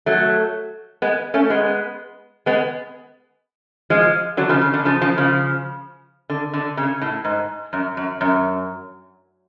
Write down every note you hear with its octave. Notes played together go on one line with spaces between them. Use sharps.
F#3 A3
G#3 B3
A3 C#4
G#3 B3
G#3 B3
F3 G#3
D3 F#3
C#3 F3
C#3
D3
C#3 F3
C#3 F3
C#3 F3
D3
D3
C#3
A2
G#2
F#2
F#2
F#2